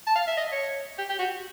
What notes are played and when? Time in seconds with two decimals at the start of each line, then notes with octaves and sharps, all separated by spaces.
0.07 A5
0.16 F5
0.27 E5
0.37 D#5
0.52 C#5
0.98 G4
1.09 G4
1.19 F#4